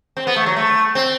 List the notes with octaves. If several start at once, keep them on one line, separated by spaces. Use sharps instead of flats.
C4
B3
A3
F#3
A3
C4